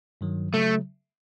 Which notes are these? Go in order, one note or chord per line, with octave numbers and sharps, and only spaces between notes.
G2 D#3 F#3
C#3 F#3 A3